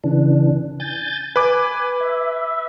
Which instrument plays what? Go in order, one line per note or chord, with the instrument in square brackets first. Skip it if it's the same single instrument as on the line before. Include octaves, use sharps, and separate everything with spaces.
[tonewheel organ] C#3 E3 D4
G#5 G6 A6
[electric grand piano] B4 D6 [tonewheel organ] G#5
[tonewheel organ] E5